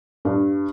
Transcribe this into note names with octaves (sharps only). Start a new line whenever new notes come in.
G2